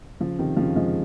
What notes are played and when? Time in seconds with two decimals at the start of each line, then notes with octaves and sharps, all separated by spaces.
0.20 C#3 F3
0.39 C3 D#3
0.57 C#3 F3
0.76 F3 G#3